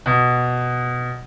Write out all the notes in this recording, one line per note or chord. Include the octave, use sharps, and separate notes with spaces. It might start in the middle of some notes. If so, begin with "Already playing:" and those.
B2